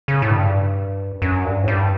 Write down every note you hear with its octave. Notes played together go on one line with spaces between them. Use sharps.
C#3
A2
G2
F#2
G2
A2
G2